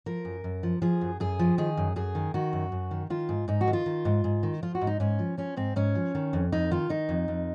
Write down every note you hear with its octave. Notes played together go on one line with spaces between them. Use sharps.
F3 A#4
F#2
F#2
F3
F3 G#4
F#2
F#2 G#4
F3
D#3 G#4
F#2
F#2 G#4
D#3
D#3 F#4
F#2
F#2
D#3
D#3 F4
G#2
G#2 D#4
F#4
D#3
F4
D#3
G#2
G#2
D#3
F3 F4
F#4
G#2
D#4
G#2 C#4
F3
F3 C#4
G#2 C4
G#2 C#4
F3
D#3
F2
F2 D#4
D#3 F4
D#3 D#4
F2
F2